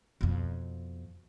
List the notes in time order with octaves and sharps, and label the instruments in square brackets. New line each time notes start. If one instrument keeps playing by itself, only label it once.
[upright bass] F2 B2